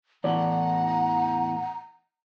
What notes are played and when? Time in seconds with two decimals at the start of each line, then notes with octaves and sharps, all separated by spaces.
0.24 E2 A2 E3 D5 F#5 A#5